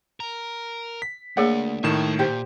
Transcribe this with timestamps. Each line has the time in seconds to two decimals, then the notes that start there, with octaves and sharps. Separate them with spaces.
0.20 A#4
1.02 B6
1.37 A3 A#3 D4 G#4 A#4 C#5 D5 F#5
1.84 A2 D#3 A3 A5 E7
2.19 A#2 G4 C5